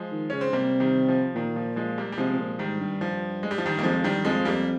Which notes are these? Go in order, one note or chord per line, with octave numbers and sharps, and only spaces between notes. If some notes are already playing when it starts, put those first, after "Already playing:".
Already playing: F3 G#3
D#3
C#3 C#4
C4
C3 G3 A#3
D#3 G3
F3
A#2 D#3
F3
F3 G#3
G3 A#3
G3
C3 F3 G#3
C3
A#2
G#2 D#3 G3
G2
F3
G#3
G3
F3
D#3 G3
A#3
F2 F3 G#3
G2 D#3 G3
F2 F3 G#3
F2 G3 A#3